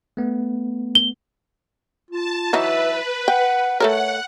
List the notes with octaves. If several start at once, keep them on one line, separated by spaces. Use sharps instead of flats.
A3 B3
G7
F4 A5
E3 F#3 D#4 B4 E5
F#5 G5
A3 A4 A#4 C#5 F#5